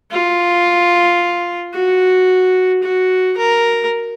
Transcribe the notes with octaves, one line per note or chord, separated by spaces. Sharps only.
F4
F#4
F#4
A#4